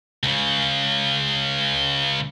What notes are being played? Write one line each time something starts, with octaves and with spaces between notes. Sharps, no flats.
C#2 C#3